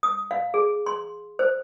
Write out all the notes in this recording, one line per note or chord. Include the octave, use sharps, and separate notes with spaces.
D#6
F5
G#4
C6
C5